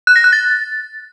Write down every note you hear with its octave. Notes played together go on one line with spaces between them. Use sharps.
F#6
A#6
F#6
A6